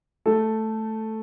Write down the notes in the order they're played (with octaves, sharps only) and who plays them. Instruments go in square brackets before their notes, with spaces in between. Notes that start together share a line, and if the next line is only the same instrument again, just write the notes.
[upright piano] A3 A4